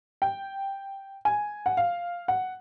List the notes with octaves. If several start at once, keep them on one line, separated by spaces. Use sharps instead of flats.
G5
G#5
F#5
F5
F#5